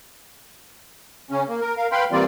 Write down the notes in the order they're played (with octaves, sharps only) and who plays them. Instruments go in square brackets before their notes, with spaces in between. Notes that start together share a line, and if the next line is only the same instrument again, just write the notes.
[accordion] C#3 C#4
A#3
A#4
A#4 F5
B4 F5 G5 B5 C6
E3 G3 A#3 C4 F4 D5